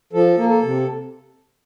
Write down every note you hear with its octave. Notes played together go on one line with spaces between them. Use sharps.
F3 A4
A#3
A4
C3